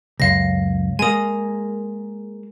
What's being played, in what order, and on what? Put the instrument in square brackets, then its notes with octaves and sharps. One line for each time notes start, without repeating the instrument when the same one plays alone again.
[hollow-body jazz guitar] C#2 F#2 [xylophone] F5 A#6
[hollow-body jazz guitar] G#3 A#3 [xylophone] G#5 D#6